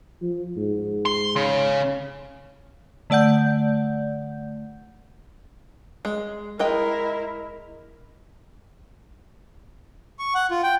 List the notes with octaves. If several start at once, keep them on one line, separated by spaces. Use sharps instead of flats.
F3
G#2
C6
C#3
D3 A3 D5 F#5 G6
G#3
G#3 E4 A#4 D#5 G5
C#6
F#5
F4
G5